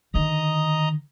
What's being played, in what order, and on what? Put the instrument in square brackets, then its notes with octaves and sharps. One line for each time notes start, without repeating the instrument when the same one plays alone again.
[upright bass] D3 D#3 [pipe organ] D#5 A#5 D#6